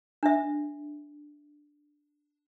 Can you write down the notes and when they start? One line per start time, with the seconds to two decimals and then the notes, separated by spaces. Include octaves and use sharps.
0.23 D4 E5